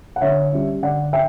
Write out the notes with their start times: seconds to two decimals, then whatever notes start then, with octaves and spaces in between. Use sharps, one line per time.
0.16 F#5
0.21 D3 C#5 E5
0.53 G3 C#4
0.82 D3 D5 F#5
1.13 E5 G5